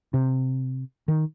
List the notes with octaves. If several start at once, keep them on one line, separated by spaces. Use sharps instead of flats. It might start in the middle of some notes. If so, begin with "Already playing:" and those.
C3
D#3